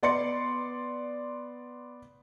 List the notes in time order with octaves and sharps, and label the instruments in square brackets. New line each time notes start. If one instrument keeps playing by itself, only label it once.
[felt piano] B3 D5 C6 A6 C#7